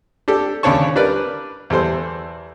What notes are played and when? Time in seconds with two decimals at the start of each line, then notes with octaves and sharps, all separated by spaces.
0.28 D4 G4 A4
0.63 D#2 C#3 D4 C#5 A5 C#6
0.95 G3 D4 A#4 B4 D5
1.70 E2 G3 A4 C5